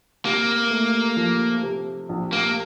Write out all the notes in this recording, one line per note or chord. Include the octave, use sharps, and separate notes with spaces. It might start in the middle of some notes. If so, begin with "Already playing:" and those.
C3 A#3
A3
F3
C3
A#1
A#3